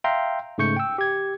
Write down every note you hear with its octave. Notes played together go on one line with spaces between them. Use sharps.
E5 F5 G5 A#5 C6
G#2 C#3 A3 C#6 G6 C#7
G5 E6
G4 G#6